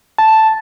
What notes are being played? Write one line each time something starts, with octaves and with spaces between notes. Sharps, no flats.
A5